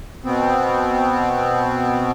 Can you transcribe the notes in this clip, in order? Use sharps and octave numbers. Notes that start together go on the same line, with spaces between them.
B2 B3 C4